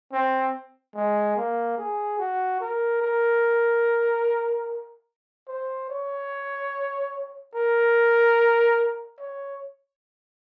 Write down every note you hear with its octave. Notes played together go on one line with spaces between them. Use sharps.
C4
G#3
A#3
G#4
F#4
A#4
A#4
C5
C#5
A#4
C#5